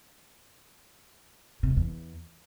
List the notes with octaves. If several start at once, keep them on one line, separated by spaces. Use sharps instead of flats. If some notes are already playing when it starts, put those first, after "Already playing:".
C3
F2
E2